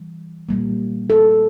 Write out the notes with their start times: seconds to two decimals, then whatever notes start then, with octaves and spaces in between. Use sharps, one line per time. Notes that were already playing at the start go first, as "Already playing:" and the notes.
Already playing: E3 G3
0.49 A#2 G3 A#3
1.10 A4